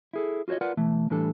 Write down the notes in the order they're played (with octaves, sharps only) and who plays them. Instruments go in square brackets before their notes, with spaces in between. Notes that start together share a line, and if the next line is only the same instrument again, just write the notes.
[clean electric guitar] E4 G#4 A4
F4 F#4 C5 C#5 D#5
F4 A#4 B4 D5 F#5
B2 E3 A3
A2 E3 G3 D4 A4